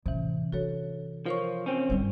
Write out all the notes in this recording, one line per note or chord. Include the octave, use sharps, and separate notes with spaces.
A1 C3 E3
D4 F#4 A4 C#5
F3 A#4 C#5 C#6
C4 C#4
G2 G3